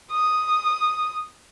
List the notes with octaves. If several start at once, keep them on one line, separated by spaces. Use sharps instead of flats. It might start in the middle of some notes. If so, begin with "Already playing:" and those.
D#6